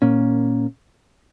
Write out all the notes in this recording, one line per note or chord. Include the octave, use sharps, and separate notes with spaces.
A#2 A#3 C#4